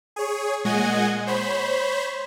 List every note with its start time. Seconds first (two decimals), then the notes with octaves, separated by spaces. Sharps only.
0.16 G#4 C#5
0.64 A#2 G#3 D#5 F#5 G#5 G#6
1.27 C5 C#5 B5